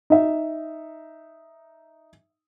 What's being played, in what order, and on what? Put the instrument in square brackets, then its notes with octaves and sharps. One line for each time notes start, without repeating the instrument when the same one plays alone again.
[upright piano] D#4 E5